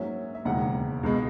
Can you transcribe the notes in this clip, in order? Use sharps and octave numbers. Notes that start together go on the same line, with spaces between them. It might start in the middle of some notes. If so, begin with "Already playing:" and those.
Already playing: G#2 F#3 A#3 C#4 E5
E5
E1 D#2 C#3 G#3 F#5
C#2 B2 G#3